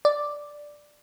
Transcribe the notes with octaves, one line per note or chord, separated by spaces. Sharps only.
D5